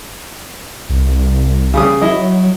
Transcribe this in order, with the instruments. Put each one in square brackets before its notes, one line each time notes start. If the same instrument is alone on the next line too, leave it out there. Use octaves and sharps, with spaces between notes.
[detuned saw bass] C2
[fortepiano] C#3 G3 D#6
[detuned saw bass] F#3 [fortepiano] E4 D#5